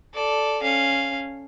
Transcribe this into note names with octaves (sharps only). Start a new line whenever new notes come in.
A4 D5
C#4 F5